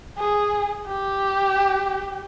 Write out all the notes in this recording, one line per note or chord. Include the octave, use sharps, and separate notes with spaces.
G#4
G4